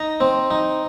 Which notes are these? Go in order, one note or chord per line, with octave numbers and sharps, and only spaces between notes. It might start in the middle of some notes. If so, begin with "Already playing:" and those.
Already playing: D#4 A#5
C4
D#4